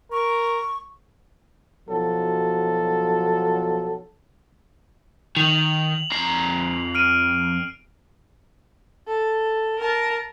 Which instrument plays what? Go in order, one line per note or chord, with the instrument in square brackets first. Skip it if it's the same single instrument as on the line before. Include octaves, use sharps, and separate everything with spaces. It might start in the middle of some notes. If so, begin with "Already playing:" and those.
[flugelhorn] A#4 [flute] C#6
[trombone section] B1 F3 F#3 A4
[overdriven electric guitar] D#3 [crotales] F7 F#7
[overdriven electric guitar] F2 A#5 [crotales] C7
[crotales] F6 D7 D#7
[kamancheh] A4
A#4 A5